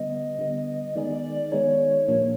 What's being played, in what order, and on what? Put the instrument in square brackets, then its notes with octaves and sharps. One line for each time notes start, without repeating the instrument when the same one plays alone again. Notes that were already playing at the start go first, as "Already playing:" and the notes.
Already playing: [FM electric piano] D3 G3 B3 [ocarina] D#5
[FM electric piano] D3 G3 B3
[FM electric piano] D#3 G#3 B3 D#4 G#4 [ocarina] D5
[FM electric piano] D#3 G#3 B3 D#4 G#4 [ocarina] C#5
[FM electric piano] A#2 F3 A#3 D4